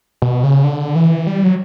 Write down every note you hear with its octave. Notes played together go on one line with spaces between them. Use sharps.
B2
C#3
D3
E3
G3
F#3